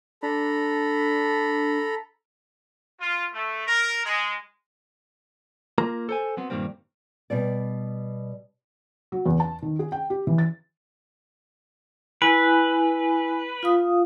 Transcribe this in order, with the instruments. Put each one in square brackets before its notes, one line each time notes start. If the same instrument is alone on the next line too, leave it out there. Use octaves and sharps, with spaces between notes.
[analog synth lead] D4 [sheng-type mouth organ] A4 A#5 B5
[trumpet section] F4
A3
A#4
G#3
[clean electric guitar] A#3 F4 A#4 A#5
A4 C5 G#5
F#3 B3 C4
G2 A#2 D#3 G3 A#3 C4
[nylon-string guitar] B2 G3 D5
[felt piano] F#3
E2
A5
D#3
G#4
G5
G4
E3
A6
[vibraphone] E4 G#5 [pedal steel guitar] B4
[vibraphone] F4 F5 D#6